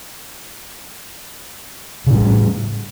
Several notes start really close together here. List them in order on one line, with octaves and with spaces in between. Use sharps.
C#3 A2 G3